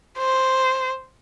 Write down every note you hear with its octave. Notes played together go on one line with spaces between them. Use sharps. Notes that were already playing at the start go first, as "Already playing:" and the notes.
C5